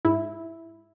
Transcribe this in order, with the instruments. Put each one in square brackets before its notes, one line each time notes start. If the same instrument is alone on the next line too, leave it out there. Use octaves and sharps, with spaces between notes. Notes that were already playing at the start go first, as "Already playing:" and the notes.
[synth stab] G#2 E4